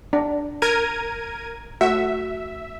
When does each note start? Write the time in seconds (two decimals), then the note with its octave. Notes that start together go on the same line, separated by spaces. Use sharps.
0.13 D4
0.62 A#4 G#6 D#7
1.81 A3 F#4 E5